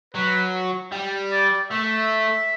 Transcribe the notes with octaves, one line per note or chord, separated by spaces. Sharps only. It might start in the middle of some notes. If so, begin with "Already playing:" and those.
F#3 B4
G3
D5
A3 E5